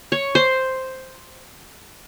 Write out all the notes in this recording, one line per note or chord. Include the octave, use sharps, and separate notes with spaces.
C#5
C5